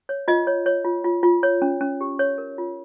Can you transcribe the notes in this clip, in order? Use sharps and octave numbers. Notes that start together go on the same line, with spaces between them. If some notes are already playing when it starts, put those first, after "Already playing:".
C#5
F4 D#5
C#5
C#5
F4
F4
F4
C#5
C#4
C#4
G4
C#5
A#4
F4